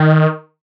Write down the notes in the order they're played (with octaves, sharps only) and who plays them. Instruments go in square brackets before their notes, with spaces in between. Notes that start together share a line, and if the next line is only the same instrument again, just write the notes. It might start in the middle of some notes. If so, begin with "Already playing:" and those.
Already playing: [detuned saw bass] D#3